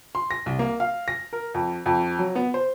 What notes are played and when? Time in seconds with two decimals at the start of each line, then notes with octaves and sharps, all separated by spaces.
0.15 C6
0.31 A#6
0.46 C2
0.59 A#3
0.80 F5
1.08 A#6
1.33 A#4
1.54 F2
1.86 F2
2.19 F#3
2.35 B3
2.54 C5